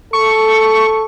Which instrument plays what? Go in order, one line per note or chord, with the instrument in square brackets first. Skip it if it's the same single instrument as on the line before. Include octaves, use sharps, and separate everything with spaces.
[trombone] A4 [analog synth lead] C#6